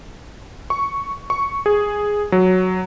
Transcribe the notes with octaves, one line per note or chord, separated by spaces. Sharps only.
C#6
C#6
G#4
F#3